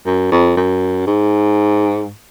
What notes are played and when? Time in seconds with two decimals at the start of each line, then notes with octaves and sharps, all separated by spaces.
0.06 F#2
0.31 F2
0.57 F#2
1.07 G#2